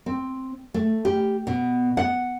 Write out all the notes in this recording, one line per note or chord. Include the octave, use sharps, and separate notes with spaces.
C4
A3
G4
B2
F#5